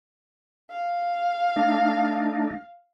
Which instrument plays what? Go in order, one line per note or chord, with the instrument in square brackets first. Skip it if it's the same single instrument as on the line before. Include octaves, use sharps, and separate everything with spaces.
[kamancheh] F5
[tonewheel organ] A3 D4 D#4